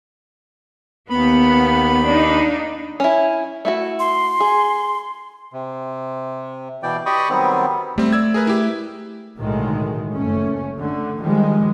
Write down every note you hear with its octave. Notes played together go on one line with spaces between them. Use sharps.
D#2 B3 B5
D4 D#4
C#4 E4
A3 E4 F#4
C6
G#4
C3
B2 E3 D5 G5
G4 D5 D#5 B5 C#6 D#6
D#3 F#3 G3 B3 C4
G3 A3 C4
D5 E6 G#6
G#4 A#4 B4
E4 G4
B1 A2 D3 D#3 G#3
F#1 A3 C#4
D3 A3
D#3 F3 G3 G#3